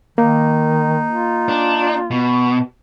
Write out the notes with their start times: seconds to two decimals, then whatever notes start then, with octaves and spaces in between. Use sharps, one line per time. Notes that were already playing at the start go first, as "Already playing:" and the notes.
0.18 D#3 A#3 D#4
1.12 F4
1.49 D4
2.11 B2